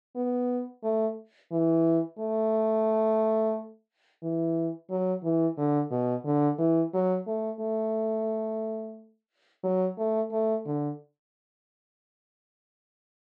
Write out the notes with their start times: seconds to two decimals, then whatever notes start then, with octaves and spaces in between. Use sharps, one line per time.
0.16 B3
0.84 A3
1.52 E3
2.19 A3
4.23 E3
4.90 F#3
5.24 E3
5.58 D3
5.91 B2
6.25 D3
6.59 E3
6.94 F#3
7.27 A3
7.61 A3
9.64 F#3
9.98 A3
10.32 A3
10.66 D3